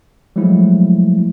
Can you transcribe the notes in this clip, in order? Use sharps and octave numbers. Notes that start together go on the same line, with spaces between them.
F3 F#3 G#3 A3 E4